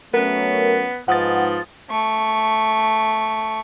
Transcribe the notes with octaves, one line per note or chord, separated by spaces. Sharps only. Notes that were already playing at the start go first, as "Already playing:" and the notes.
F#3 A3 B3 C#4 A#4
G#2 F3 B4 F#5 D#6 A6
A3 C#6